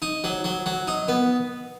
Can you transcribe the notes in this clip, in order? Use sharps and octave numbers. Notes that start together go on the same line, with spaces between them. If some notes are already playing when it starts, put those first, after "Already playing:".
D#4
F#3
F#3
F#3
D#4
B3